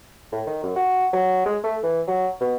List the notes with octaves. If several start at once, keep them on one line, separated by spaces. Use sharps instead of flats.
A2
D#3
F#2
F#4
F#3
G#3
A3
E3
F#3
B2